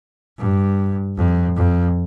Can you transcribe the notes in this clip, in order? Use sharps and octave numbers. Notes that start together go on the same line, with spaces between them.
G2
F2
F2